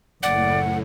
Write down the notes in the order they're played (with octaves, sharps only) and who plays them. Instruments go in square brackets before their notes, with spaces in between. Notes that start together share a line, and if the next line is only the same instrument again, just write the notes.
[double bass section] F#1 [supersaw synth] A2 [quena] D5 [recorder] F#5